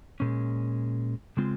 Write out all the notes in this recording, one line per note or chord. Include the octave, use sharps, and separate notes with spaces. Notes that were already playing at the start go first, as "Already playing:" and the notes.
A#2 G#3 C#4
C#3 G#3 C4 F4